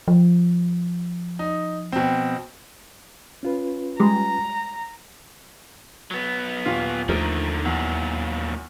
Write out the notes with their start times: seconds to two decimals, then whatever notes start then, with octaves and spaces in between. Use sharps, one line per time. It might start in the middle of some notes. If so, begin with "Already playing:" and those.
0.08 F3
1.39 D#4
1.92 B2 C4
3.43 C#4 F4 B4
4.00 G3 G#3 A#5
6.11 F#3 B3
6.66 D#1 A#2 F4
7.09 D#2 D3 D#3 F3 A3 A#4
7.65 E2 A#2 F#3